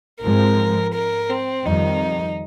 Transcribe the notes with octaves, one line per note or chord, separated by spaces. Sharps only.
G#2 F3 G#3 C4 A#4
A#4
C4
F2 D#3 G3 D#4